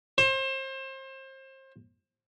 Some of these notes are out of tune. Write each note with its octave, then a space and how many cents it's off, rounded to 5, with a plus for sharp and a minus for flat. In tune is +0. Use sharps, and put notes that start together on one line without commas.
C5 +30